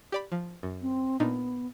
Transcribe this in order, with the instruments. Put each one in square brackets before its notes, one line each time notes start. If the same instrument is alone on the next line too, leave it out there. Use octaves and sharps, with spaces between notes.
[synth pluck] G4 D5 B5
F3
F#2
[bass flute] C4
[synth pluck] A#2 D4 D#4 [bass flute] B3